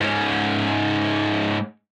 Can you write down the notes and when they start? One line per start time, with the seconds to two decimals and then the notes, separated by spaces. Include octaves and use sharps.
0.01 G#2 C#4